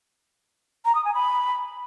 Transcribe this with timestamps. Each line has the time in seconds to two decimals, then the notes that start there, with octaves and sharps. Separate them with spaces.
0.85 A#5
0.95 D#6
1.05 G#5
1.15 B5